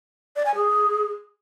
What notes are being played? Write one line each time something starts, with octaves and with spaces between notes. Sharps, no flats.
D5
G#5
G#4